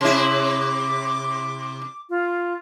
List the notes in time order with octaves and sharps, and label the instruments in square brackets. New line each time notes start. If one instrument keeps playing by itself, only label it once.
[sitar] C3 E4 [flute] D6
[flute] F4